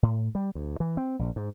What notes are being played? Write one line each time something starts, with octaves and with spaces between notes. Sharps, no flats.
A2
G3
D2
E3
C4
A#1
G#2